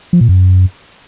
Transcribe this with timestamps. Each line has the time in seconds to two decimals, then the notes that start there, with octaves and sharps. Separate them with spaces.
0.13 F3
0.21 A#2
0.29 F#2